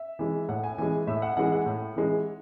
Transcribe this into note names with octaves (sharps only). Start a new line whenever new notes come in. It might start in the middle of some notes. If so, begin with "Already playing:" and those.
Already playing: E5
E3 G#3
A2 F#5
G#5
E3 G#3 G#5
A2 E5
F#5
E3 G#3 F#5
F#5
A2
E3 G#3